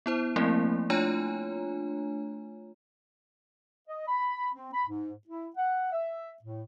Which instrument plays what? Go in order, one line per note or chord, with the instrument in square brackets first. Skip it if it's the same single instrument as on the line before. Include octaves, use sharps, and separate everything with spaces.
[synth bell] B3 E4 C5
F3 A3 A#3 C4 E4
A3 D4 F4 C#5 G#5 A#5
[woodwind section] D#5
B5
C4
B5
G#2
E4
F#5
E5
A2